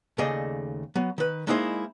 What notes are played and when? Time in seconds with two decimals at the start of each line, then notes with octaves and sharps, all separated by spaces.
0.18 D#2 C#3 A3 G#4 D5 D#5
0.95 F#3 B3
1.18 D#3 B4
1.47 G#3 A#3 D#4 E4 G#4 C5